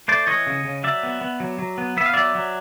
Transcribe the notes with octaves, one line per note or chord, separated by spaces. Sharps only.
A3 C5 D5
E3 C#5 D#5
C#3
C#3
F#3 D5 E5
B3
B3
F#3
F#3
B3
B3 E5
F5
F#3 D5 E5
F#3